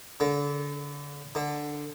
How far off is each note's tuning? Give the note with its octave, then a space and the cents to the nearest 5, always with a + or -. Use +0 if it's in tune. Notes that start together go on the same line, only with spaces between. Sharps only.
D3 -30
D3 +5